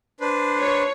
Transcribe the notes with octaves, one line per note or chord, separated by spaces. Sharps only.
D4 B4 C5
C#5